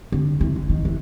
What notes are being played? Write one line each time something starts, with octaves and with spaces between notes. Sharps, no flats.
D3
E3
D3
D#3
E3